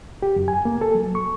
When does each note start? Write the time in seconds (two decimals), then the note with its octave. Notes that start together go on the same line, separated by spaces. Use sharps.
0.22 G4
0.36 F#2
0.48 G#5
0.65 A#3
0.81 A4
0.95 F#3
1.15 C#6